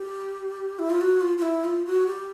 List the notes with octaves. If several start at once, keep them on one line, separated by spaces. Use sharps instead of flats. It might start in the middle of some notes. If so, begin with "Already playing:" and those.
Already playing: G4
E4
F4
F#4
F4
F4
E4
F4
F#4
G4